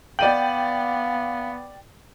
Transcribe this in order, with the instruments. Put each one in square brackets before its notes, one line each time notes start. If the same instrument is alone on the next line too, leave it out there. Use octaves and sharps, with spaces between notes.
[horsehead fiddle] B3 [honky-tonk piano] D5 D#7 F#7 [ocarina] F5 [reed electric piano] G5